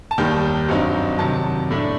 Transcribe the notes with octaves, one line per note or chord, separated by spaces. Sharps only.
A5
D#2 D#3 G3 G5
G2 F#3 C4 D#4
C3 D#3 F#3 A5
A2 A3 D4